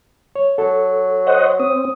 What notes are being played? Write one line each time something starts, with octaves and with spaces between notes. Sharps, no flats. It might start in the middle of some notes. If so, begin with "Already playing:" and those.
C#5
F#3 A4
C5 D#5 F#5
C4 D#6